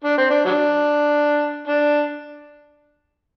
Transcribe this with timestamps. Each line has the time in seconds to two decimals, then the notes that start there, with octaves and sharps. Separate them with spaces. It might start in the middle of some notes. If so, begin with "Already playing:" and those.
0.04 D4
0.18 C4
0.30 D4
0.45 F#3 D4
1.67 D4